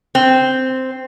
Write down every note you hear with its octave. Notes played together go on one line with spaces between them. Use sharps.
C4